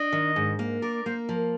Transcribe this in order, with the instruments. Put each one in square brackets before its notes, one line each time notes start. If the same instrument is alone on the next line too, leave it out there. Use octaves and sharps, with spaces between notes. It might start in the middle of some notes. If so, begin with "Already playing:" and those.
Already playing: [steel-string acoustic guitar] D4 [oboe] D#5
[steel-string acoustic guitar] D#3
G#2
A#3
[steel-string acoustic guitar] A#4 [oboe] D5
[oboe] D5
[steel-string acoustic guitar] A#3 [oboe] C5
[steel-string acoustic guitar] F3